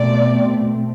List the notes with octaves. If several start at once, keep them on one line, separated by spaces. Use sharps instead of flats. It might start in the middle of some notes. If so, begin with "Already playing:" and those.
Already playing: B2 A3 C4 D5